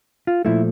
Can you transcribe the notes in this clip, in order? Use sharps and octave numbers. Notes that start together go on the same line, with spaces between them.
F4
A#2 F3 A3 E4